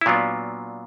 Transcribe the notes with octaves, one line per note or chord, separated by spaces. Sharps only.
E4
A#2 F#3 B3 D4 F4